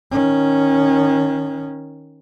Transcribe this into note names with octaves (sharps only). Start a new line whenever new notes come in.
D#3 C#4